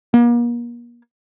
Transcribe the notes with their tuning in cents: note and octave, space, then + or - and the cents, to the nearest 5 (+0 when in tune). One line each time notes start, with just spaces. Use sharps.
A#3 +40